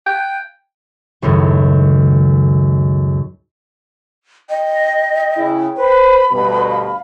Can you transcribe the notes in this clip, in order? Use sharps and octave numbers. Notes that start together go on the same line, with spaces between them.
G5
C#2 F#2 A2 D#3
D#5 G5
C#3 E4
B4 C5 B5
D2 G2 B2 B4
F5